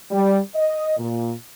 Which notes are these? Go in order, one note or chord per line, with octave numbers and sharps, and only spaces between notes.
G3
D#5
A#2